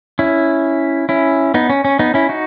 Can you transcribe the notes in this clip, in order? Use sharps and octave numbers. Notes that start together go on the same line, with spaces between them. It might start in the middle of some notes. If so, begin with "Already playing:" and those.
C#4 E4
C#4 E4
B3 D#4
C#4
C#4
B3 D#4
C#4 E4
D#4 F#4